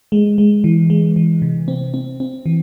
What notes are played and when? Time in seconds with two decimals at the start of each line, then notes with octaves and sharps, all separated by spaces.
0.12 G#3
0.38 G#3
0.64 E3
0.90 G#3
1.16 E3
1.42 C3
1.68 C4
1.94 C4
2.20 C4
2.46 E3